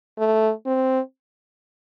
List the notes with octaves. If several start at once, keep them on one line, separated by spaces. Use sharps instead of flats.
A3
C4